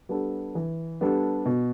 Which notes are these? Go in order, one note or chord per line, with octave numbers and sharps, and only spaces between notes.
G3 B3 D4 A4
E3
G3 B3 D4 A4
B2